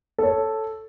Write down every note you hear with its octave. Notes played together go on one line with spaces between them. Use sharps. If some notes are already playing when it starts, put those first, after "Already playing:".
A4 C#5